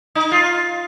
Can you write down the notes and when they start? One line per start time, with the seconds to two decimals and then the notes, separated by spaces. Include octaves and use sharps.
0.15 D#4
0.32 F4